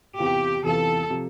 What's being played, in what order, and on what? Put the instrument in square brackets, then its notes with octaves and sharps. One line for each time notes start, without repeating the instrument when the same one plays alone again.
[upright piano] E2 C3 E3 B3 F4 [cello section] G4
[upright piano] E2 C3 E3 B3 F4 [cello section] A4
[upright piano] C3 F3